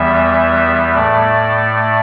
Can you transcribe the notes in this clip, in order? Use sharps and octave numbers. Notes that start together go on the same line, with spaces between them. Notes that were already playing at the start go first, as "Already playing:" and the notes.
Already playing: E2 E3 G3 B3 E5
A2 A3 D5